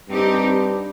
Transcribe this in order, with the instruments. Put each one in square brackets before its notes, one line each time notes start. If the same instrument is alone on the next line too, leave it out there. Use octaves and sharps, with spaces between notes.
[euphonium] G2 [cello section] C4 D#4 G4